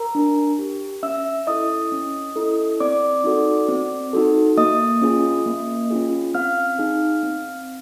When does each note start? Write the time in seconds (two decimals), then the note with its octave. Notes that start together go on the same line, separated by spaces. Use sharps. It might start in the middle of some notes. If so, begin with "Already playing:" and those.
Already playing: A#4 A#5
0.15 D4
0.59 G4
1.03 C#4 E5 E6
1.47 E4 A4 D#5 D#6
1.92 C#4
2.36 E4 A4
2.80 C4 D5 D6
3.24 D#4 F#4 A4
3.68 C4
4.13 D#4 F#4 A4
4.57 A#3 D#5 D#6
5.02 C#4 F4 G#4
5.46 A#3
5.90 C#4 F4 G#4
6.34 C4 F5 F6
6.79 D#4 G#4
7.23 C4